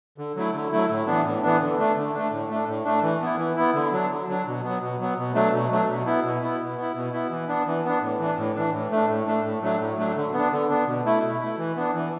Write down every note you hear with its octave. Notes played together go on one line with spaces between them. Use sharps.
D3
F#3 A3 E4
D3
F#3 A3 E4
A2
E3 B3 D4
A2
E3 B3 D4
D3
A3 D4
D3
A3 D4
A2
A3 D4
A2
A3 D4
E3
B3 E4
E3
B3 E4
D3
F#3 D4
D3
F#3 D4
B2
F#3 B3
B2
F#3 B3
B2
F#3 A3 D4
B2
F#3 A3 D4
B2
B3 E4
B2
B3 E4
B2
B3 E4
B2
B3 E4
E3
B3 D4
E3
B3 D4
A2
E3 D4
A2
E3 D4
A2
A3 D4
A2
A3 D4
A2
F#3 A3 D4
A2
F#3 A3 D4
D3
B3 D4
D3
B3 D4
B2
A3 E4
B2
A3 E4
E3
B3 D4
E3